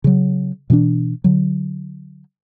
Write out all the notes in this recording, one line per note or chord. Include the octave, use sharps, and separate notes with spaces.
C#3 F#3
B2 E3 C#4 D4
D3 F#3